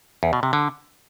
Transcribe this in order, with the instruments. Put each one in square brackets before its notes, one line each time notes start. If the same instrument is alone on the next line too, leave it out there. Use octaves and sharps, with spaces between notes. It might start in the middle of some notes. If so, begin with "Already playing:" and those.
[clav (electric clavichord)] E2
B2
C3
D3